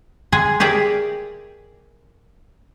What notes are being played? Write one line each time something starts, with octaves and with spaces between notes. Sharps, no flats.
G#3 G#4 G#5
G4 G#4 A#4 D5 E5